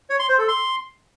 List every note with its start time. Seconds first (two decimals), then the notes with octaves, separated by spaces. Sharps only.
0.10 C#5
0.19 C6
0.29 C5
0.38 A4
0.48 C6